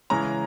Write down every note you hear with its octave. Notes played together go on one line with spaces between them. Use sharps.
C#3 E3 G#3 C#4 A#5